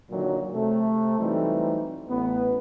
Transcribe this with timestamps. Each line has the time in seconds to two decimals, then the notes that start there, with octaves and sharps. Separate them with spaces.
0.10 A#2 D3 D#3 F#3
0.52 C3 A3
1.20 E3 F#3 G3 A3 C4 D#4
2.09 A1 B3